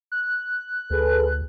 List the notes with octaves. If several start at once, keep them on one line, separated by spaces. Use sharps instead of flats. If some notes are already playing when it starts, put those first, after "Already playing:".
F#6
D2 G#4 A4 B4